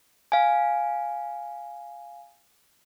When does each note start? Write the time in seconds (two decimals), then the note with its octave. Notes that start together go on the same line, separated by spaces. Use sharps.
0.32 F5 G#5